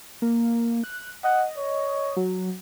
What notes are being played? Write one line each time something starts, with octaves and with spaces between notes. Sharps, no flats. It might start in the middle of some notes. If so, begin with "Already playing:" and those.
A#3
F#6
D#5 F#5
C#5
F#3